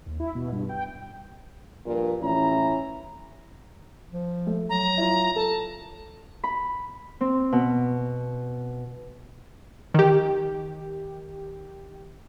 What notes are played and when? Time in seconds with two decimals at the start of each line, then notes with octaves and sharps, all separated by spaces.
0.06 D#2
0.20 E4
0.35 B2
0.52 G2
0.69 G5
1.86 A#1 G2 A#2
2.22 A1 C#4 E4 A#5
4.12 F3
4.47 A3
4.69 F#3 A#5
4.98 E4 F4
5.36 A4 A5
6.44 B5
7.21 C4
7.52 B2
9.94 D#3 G4